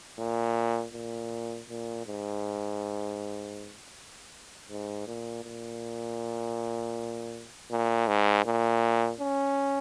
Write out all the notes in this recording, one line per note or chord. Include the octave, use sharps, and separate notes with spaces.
A#2
A#2
A#2
G#2
G#2
A#2
A#2
A#2
G#2
A#2
C#4